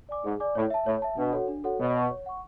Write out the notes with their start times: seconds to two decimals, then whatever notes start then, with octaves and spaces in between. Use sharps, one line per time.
0.09 D5 G#5 D6
0.24 G#2 G#4
0.40 D5 G#5 D6
0.55 A2 C#5
0.70 E5 A5
0.86 A2 C#5
1.02 E5 A5
1.17 B2 D4
1.33 F#4 A4 C#5 F#5
1.48 D4
1.64 F#4 A4 C#5 F#5
1.79 B2 C#5
1.95 F#5 C#6
2.10 C#5
2.26 F#5 C#6